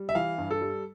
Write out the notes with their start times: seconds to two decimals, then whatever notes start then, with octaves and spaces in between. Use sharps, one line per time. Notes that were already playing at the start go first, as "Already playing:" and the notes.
Already playing: G3
0.09 E5
0.15 E3 F5
0.38 G2
0.51 A4
0.61 G3